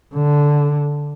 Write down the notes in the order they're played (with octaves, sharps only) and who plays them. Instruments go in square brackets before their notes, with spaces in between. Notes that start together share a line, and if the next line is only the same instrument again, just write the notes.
[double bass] D3